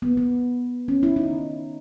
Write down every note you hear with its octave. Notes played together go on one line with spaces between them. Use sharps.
B3
B3
C#4
E4
D#4